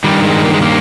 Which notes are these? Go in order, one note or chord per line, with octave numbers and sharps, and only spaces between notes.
G2 D#3 G3
G#3
A#3
G#3
A#3